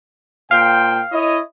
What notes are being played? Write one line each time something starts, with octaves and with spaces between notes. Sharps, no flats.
A#2 C5 F5 G5
E4 C#5 D#5